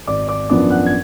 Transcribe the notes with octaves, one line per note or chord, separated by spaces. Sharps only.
G#1 D5 D6
D5 D6
F#2 F3 B3 D4 D5 D6
F#5 F#6
G#6